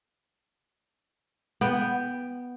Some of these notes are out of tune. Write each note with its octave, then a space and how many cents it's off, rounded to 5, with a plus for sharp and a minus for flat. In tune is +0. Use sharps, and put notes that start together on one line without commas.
B3 +0 G5 +0